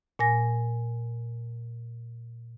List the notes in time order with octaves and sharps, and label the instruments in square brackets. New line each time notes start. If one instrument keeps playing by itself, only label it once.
[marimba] A#2 G#5 A#6